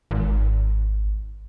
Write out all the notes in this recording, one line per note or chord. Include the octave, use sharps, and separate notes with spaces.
G#1